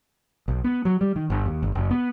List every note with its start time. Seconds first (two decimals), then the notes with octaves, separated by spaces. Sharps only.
0.48 B1
0.64 B3
0.85 F#3
1.01 G3
1.16 D#3
1.30 G1
1.46 D#2
1.63 G1
1.75 F#1
1.91 B3